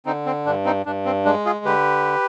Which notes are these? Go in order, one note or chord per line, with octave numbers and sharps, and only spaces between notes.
D3 C4 D#4
C4
G2 D4
C4 D#4
G2 D4
C4
G#3 D4
F4 G#4
D3 G4 B4